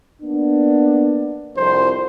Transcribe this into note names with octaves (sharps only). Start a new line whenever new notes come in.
A#3 B3 D4
C2 F2 C5